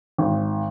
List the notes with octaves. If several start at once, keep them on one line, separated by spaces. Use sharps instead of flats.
G#1